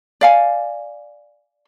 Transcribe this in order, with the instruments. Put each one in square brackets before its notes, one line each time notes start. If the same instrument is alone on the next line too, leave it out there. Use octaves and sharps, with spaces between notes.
[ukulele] D5 F5 G#5